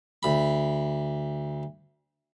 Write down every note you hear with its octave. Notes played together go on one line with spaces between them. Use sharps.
D2 B5